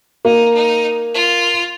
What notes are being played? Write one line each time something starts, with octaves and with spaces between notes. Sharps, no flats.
A#3 D#4
D#4
F4